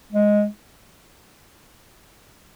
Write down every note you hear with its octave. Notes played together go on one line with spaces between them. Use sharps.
G#3